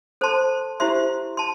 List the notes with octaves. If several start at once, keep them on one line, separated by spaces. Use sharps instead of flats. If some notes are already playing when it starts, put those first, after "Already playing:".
A4 C5 A5 C6
E4 G4 C5 E5 C6
A5 C6